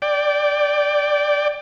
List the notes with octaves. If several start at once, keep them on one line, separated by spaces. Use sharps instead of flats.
D5 G5